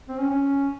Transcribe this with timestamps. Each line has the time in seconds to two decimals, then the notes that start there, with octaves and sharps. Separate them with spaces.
0.08 C4
0.19 C#4
0.29 C#4